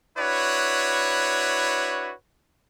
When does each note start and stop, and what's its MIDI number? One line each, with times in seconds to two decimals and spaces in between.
0.18 2.12 62
0.18 2.12 64
0.18 2.12 66
0.18 2.12 71
0.18 2.12 73